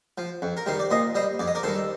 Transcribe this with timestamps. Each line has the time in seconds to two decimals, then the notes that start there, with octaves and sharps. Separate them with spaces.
0.18 F3
0.42 F2
0.57 A#4
0.66 D#3 G3 C5
0.79 D5
0.91 A#2 C5 D#5
1.15 G3 C5 D#5
1.39 F2 D5
1.47 D#5
1.55 A#4 D5
1.63 D#3 G3 A4 C5